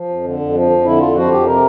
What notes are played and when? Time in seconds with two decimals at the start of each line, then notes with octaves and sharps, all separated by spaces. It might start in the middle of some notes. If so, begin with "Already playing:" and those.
Already playing: F3
0.09 F2
0.24 D3
0.39 F2
0.54 F3
0.70 F2
0.85 D3 E4
1.00 F2 F4
1.15 F3 F#4
1.31 F2 G4
1.46 C3 A#4